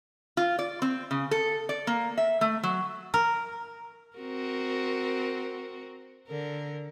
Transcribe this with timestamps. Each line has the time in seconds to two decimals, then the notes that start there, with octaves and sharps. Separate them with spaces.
0.37 F4
0.59 D5
0.82 C4
1.11 C#3
1.31 A4
1.69 D5
1.87 A#3
2.18 E5
2.41 A3
2.63 F#3
3.14 A#4
4.17 C4 F#4 A#4
6.28 D3 A#4